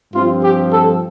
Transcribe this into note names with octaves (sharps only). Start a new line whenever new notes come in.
G2 F3 C4 F4
G4
A4